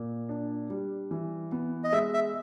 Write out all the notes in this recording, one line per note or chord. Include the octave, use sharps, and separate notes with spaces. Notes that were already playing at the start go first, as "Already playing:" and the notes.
Already playing: A#2
D4
G3
E3
B3
D#5
G#3 E5
E5